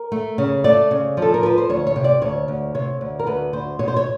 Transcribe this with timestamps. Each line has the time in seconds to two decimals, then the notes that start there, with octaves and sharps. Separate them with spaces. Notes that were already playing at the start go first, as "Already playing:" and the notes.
Already playing: A#4
0.12 A3
0.38 C#3
0.64 A3 D5
0.91 C#3
1.17 F3 A4
1.34 A#4
1.43 F3 B4
1.58 C5
1.69 D2 C#5
1.87 C#5
1.96 C3
2.04 D5
2.22 D2 C#5
2.48 D2
2.75 C3 C#5
3.01 D2
3.19 A#4
3.27 D2 B4
3.53 D2 C5
3.79 B2 C#5
3.88 C5
3.96 C#5